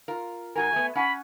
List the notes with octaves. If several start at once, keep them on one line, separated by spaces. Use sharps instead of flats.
F4 A#4
G#2 F#4 A#4 G#5
A3 B3
C#4 F#5 G#5 B5